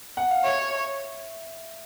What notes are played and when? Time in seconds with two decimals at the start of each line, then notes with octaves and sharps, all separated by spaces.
0.17 F#5
0.31 F5
0.44 C#5 E5